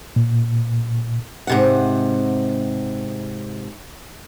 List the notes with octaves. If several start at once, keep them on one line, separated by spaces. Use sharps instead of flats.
A#2
G#2 C3 F#5